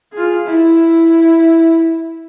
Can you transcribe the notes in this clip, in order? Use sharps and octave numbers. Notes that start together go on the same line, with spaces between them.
F4 G#4
E4